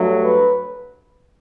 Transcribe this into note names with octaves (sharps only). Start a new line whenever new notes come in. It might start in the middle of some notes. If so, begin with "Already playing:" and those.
Already playing: G2 F#3 A3
B4